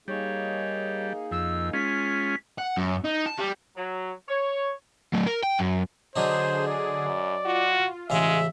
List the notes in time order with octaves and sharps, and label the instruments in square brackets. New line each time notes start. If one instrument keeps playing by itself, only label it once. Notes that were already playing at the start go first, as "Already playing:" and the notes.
[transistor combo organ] G3 [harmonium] A#3 D#4 G#4 [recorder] C#5
[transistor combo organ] F2 [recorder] E6
[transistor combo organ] G#3 C#4 F4 [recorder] B6
[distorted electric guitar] F#5
F#2
D#4
A5
G3
[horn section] F#3
C#5
[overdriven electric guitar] F#3 A3
A#4
G5
F#2
[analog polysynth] D3 G#4 [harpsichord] F#3 D4 D#4 [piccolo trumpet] C5
[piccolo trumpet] D5
[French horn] F#2
[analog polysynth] F4 [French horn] F#4
[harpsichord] A1 C#3 F5 [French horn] G#3 [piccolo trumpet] E5